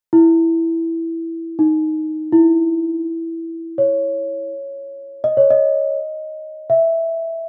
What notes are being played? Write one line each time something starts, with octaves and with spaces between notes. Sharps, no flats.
E4
D#4
E4
C#5
D#5
C#5
D#5
E5